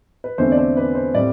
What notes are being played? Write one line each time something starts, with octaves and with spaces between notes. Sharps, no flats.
B4
E2 D3 A3 C4 C5
D5
C5
B4
C5
A2 G3 C4 D5